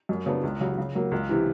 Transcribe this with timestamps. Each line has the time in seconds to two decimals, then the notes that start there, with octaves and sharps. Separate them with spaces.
0.09 F#2
0.26 C#3 F#3 B3 D4
0.43 C#2
0.60 C#3 F#3
0.78 C#3
0.95 F#3 A#3
1.11 C#2
1.29 C3 E3